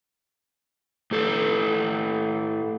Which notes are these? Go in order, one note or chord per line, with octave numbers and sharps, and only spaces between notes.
A2 G4 A4